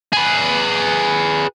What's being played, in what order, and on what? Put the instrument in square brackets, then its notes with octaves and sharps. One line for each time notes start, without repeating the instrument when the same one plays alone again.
[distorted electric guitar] G#4 B4